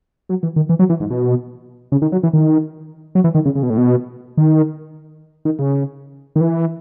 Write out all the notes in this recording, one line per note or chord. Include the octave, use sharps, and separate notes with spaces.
F#3
E3
D#3
E3
F#3
E3
G#2
B2
C#3
D#3
F#3
E3
D#3
F#3
E3
D#3
C#3
C#3
B2
A2
B2
D#3
D#3
C#3
D#3
E3